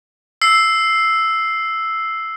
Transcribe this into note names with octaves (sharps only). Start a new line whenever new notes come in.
E6 C7